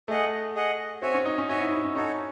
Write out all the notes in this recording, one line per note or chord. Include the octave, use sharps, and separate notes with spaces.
A3 G#4 D#5 F#5
G#4 D#5 F#5
C4 F#4 C#5 E5 G#5
C#4
D#4
C#4
D#4 F#4 C#5 E5 G#5
E4
E4
C#4
C#4 D#4 F#4 A4 C#5